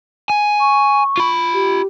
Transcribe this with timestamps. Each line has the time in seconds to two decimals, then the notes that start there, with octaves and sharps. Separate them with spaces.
0.30 G#5
0.60 C#6
1.18 F4 B5
1.53 G4